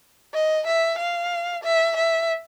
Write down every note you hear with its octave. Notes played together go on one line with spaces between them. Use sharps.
D#5
E5
F5
E5
E5